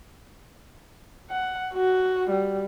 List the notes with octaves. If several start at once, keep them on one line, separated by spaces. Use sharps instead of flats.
F#5
F#4
G3